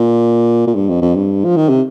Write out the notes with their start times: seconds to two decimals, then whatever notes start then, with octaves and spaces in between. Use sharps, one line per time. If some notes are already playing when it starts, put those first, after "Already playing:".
Already playing: A#2
0.68 A#2
0.75 G2
0.89 F2
1.02 F2
1.16 G2
1.45 F3
1.57 D#3
1.70 C3